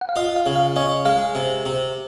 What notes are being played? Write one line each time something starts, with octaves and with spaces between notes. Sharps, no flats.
F#5
F5
F4 D#5
F5
C#3
F5
C#4 D#5
G#3 F5
C3
C3